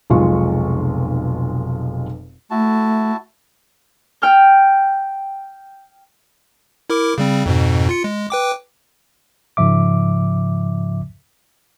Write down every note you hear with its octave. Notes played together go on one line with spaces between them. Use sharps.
F1 B1 B2 G#3 F4 C#6
A3 E4 F#4 A5
G5 F6 G6
E4 A#4 D6
C#3 G3 C4
F2 G#2 B2
F4 C#7
G#3
B4 G5 D6
G#2 C#3 F3 E5 D6